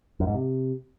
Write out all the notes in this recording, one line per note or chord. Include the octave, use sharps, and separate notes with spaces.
F#2
G#2
C3